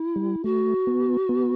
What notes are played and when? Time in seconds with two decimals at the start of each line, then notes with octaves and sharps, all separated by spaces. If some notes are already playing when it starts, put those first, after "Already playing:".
Already playing: E4
0.16 G3
0.44 A3 F#4
0.87 B3
1.29 B3